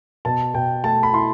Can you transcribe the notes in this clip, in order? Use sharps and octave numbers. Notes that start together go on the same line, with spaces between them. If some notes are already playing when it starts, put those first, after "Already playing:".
B2 A5
B2 G5
A3 A5
B5
E4 C6